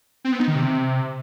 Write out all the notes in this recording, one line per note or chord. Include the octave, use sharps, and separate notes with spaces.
C4
B3
D#4
D#3
C3